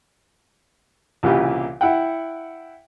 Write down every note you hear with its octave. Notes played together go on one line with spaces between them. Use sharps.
C2 A#2 C#3 E3 E4 G4
E4 F#5 G5